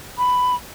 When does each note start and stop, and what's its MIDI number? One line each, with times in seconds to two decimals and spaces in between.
0.18 0.55 83